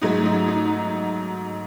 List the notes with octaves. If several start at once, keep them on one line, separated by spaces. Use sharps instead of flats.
G#2 F#3 A3 D#4
D#4
D#4